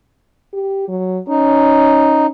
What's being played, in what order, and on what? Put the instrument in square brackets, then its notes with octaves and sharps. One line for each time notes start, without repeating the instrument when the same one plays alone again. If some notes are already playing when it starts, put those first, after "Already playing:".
[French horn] G4
F#3
[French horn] C#4 [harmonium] D#4